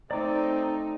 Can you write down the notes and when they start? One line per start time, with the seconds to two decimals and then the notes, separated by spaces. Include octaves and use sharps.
0.11 A3 C4 D#4 D5 A#5 D6